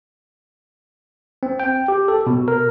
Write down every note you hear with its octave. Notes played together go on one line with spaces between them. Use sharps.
C4
G5
G4
A4
B2
A#4